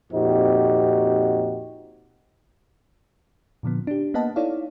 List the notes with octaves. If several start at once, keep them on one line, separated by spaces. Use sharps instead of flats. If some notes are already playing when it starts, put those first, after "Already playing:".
F2 A#2 C4 D#4 F#4 G4
A#2 D3 F3 B3
D4 G4
A#3 B3 B4 D#5 F#5 A5
D#4 E4 A4 C#5 D5 F5